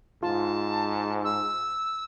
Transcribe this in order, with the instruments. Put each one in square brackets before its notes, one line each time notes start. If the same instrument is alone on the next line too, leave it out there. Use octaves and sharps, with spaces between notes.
[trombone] G#2 [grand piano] F4 [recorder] A5
[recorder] E6